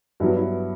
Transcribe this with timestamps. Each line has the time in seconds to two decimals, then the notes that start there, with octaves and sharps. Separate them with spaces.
0.20 G2 F#3 B3 E4
0.36 E4